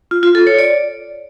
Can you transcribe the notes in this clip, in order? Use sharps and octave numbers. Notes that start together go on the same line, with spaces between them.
F4
F4
A4
C#5
D5